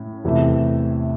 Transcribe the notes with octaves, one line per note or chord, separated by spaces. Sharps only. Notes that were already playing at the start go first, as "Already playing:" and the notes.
Already playing: A2 C#4 E4
E2 C3 E3 A3